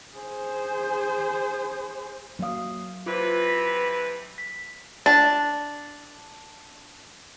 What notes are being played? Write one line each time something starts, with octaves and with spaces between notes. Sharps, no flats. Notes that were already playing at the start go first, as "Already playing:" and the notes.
G#4 C5
F#3 A#3 F5 D#6
C3 E3 F4 B4 C5
A#6 B6
B6
D4 A5